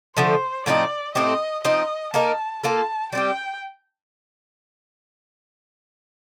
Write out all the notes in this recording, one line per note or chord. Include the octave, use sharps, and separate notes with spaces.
D3 F3 A3 C5
A2 F3 C4 D#4 D5
A2 A3 C4 G4 D#5
F3 C4 D#4 D#5
A#3 D#4 A#4 A5
A#3 F4 A4 A5
G3 C4 G4 G5